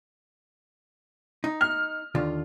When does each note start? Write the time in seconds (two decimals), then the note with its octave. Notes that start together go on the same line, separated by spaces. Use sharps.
1.44 D#4
1.61 F6
2.15 D#2 D3 F4